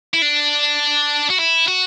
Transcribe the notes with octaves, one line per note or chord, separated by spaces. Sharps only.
E4
D4
F#4
E4
F#4